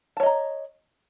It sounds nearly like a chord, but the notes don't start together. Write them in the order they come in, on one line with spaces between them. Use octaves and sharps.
A5 C#5 D#5 A#5